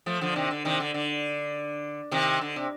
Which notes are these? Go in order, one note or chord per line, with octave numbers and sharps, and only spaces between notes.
F3 A3
D3 F3
C3 D#3
D3
C3 D#3
D3
D3
C3 D#3
D3
C3